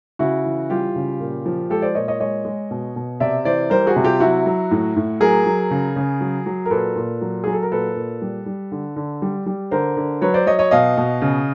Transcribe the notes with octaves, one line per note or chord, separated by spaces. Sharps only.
C#3 E4 F#4
E3
G3 F4 G4
C#3
A#2
F3
G#3 G4 A4
C5 D5
A#2 C#5 D#5
C#5 D#5
G#3 C#5 D#5
G#3
B2
B2
C3 D5 E5
E3 C5 D5
G3 A#4 C5
F#4 G#4
C3
F4 G4
F#3 E4 F#4
F#3
A2
A2
F#3 G#4 A#4
F#3
C#3
C#3
F#3
F#3
A#4
A#2 A4 B4
A#2
F#3
F#3 G#4
A4
A#4
A#2 A4 B4
A#2
G3
G3
D3
D3
G3
G3
D3 A#4 C5
D3
F#3 B4 C#5
C5 D5
F#3 C#5 D#5
C#5 D#5
B2 D#5 F5
B2
C#3